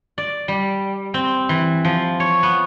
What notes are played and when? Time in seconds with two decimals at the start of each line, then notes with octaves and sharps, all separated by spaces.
0.18 D5
0.48 G3
1.14 C4
1.49 E3
1.85 F3
2.20 C#5
2.43 B3